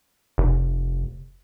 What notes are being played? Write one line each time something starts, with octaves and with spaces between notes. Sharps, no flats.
F1